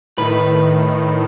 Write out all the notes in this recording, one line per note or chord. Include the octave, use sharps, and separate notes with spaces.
A2 D#3 B4